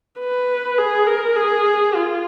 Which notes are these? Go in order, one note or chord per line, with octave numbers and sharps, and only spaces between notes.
B4
G#4
A#4
G#4
F4